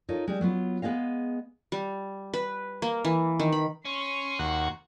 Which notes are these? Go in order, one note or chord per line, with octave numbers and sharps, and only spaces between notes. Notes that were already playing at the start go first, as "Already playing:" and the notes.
D#4 F4 A4 A#4 C#5 D#5
G3 G#3
F#3 B3 F4
G#3 B3 G#4 D#5 F5
G3
B4
A#3
E3
D#3
B5
C#4 C6 C#6
D#2 F#4 F#5